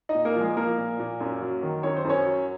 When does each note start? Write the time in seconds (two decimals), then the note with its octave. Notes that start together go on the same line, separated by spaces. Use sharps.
0.09 D#4 D#5
0.15 A#2
0.25 A#3 A#4
0.36 F3
0.41 G#3 G#4
0.57 F3 A#3 A#4
0.78 A#2
0.99 A#2
1.21 F#2
1.41 F#3
1.63 D#3
1.83 F#2 C#5
1.97 C5
2.05 F#2 C#4 C#5
2.26 F#3